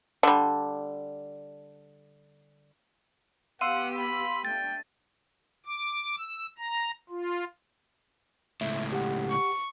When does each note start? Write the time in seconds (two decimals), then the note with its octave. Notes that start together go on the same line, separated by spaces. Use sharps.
0.23 D3 G3
3.61 B3 G4 F5 F#5 C6 E6 D#7
3.96 B5
4.45 A3 D4 G5 A6
5.66 D6
6.17 E6
6.58 A#5
7.09 F4
8.61 C#2 A2 E5
8.92 G4 F#5
9.30 C#6